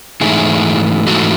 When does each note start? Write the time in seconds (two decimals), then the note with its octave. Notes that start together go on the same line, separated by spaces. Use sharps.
0.21 G#2 E3 A3 D#4 E4 G#4
1.06 G#2 E3 A3 D#4 F#4 A4